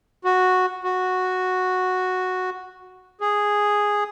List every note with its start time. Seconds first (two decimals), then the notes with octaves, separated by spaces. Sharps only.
0.24 F#4
0.84 F#4
3.21 G#4